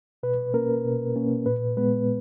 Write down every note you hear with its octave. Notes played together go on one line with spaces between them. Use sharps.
B2 B4
A#3 C#4 A#4
B2
A#3 C#4
A#2 B4
G#3 B3 B4